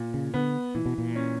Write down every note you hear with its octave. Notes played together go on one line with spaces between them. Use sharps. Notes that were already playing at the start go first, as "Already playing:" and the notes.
Already playing: A#2
C#3
D3 B3
A#2 E3
B2
A#2
C#4